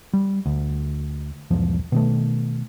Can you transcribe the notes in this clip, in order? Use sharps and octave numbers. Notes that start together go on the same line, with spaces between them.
G3
D2
B1 E2 G#2 F3
B2 D#3 A3